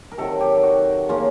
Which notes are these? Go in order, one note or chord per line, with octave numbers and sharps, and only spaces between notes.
A#4
C3 D#3 F#3 A4
G4
F#4
C#3 F#3 A#3 C#4 F4